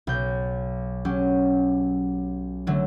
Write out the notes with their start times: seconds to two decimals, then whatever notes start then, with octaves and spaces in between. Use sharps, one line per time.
0.07 B1 G6
1.05 F#3 C#4 G4
2.67 D3 F#3 A3